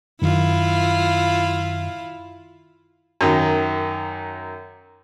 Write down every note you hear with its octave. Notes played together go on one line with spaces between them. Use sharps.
F#2 D#3 E4 F4
F#2 D#3